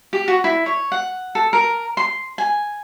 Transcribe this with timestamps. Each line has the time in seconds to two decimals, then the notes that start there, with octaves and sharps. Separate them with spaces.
0.13 G4
0.28 F#4
0.44 E4
0.66 C#5
0.92 F#5
1.35 A4
1.53 A#4
1.97 C6
2.38 G#5